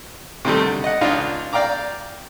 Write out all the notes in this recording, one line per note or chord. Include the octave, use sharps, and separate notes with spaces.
C3 D#3 G3 A3
D3
D#5 F#5
C#2 D4 D#4 F4 F5
D5 F5 G5 A#5 D6